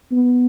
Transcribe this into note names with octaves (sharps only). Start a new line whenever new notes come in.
B3